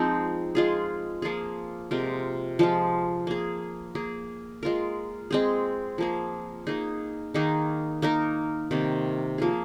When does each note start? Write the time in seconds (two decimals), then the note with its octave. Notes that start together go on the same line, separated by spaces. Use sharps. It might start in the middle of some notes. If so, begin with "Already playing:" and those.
Already playing: F3 G#3 C4 D#4
0.55 G#3 F4 G#4
1.22 F3 A#3 F4 G#4
1.91 C3 G#3 F4 A#4
2.59 F3 G#3 F4
3.27 A#3 G#4
3.95 A#3 G#4
4.63 G#3 F4 A#4
5.31 G#3 C4 G#4
5.98 F3 A#3 G#4
6.67 A#3 D#4 G#4
7.34 D#3 A#3 D#4 G#4
8.02 A#3 D#4 A#4
8.71 C3 D#3 A#3
9.38 F3 A#3 F4 G#4